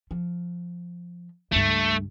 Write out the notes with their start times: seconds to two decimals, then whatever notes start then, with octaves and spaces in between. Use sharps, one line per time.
0.11 F3
1.52 C#2 G2 A3